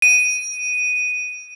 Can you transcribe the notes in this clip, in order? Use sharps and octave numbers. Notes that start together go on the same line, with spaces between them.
D#7